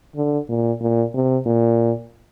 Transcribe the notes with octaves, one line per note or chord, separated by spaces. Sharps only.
D3
A#2
A#2
C3
A#2